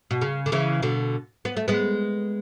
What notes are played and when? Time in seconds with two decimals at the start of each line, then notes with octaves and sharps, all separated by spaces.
0.11 B2
0.21 C#3
0.46 D3
0.52 C#3 E3
0.82 B2 D3
1.45 B3
1.57 A3
1.68 G#3 B3